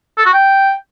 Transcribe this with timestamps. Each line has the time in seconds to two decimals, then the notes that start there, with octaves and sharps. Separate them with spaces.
0.18 A4
0.26 F#4
0.33 G5